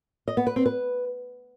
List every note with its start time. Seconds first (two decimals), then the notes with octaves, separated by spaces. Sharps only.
0.28 D#5
0.37 B3
0.47 B4
0.56 C4
0.66 B4